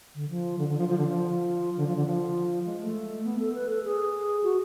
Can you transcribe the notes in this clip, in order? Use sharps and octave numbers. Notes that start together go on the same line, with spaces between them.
D3
F3
D3
D3
F3
F3
D3
F3
D3
F3
D3
F3
G#3
A3
B3
A4
B4
A4
G#4
F#4